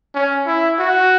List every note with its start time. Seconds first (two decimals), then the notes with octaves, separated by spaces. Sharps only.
0.15 C#4
0.46 E4
0.79 F#4